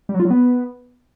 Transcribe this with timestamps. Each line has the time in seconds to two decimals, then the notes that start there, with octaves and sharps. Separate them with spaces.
0.09 G3
0.14 F#3
0.20 F4
0.25 F#3
0.30 B3